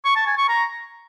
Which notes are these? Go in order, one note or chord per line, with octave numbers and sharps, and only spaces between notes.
C#6
A5
G#5
C#6
A#5